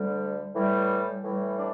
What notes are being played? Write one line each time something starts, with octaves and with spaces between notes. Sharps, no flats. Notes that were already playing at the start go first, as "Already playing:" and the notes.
Already playing: D2 D3 G3
A2 E3 G3
A2 E3 G3
D4